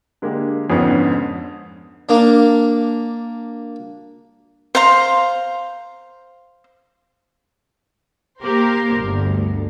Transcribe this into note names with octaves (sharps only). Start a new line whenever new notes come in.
D3 G#3 A#3 G4
F2 G#2 D3 B3 C#4
A#3 D4
C5 F5 A#5 C6
A#3 G4 A#4 C5
G1 D2